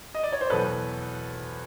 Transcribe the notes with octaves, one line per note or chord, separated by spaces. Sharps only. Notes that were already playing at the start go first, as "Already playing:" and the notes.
D#5
D5
C#5
C5
E2 B2 F#3 A4 B4